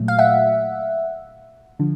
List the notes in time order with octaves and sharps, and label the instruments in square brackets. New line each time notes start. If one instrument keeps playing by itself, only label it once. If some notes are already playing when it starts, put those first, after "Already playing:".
Already playing: [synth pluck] A#2 F#3 A3
F5
E5 F#5
D3 F3